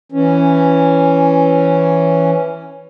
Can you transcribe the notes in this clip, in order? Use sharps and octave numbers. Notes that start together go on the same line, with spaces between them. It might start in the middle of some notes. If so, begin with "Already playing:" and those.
E3 C#4